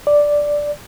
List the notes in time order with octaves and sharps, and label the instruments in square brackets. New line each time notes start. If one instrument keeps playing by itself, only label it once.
[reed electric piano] D5